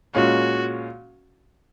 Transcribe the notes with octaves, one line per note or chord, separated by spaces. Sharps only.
A#2 G#3 C#4 F#4